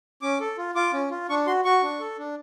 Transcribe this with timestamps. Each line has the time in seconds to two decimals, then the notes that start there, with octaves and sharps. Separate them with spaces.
0.22 C#4 D6
0.41 A4
0.58 F4
0.75 F4 D6
0.93 C#4
1.11 F4
1.29 D4 C#6
1.47 F#4 C6
1.65 F#4 C#6
1.83 D4
2.00 A4
2.18 D4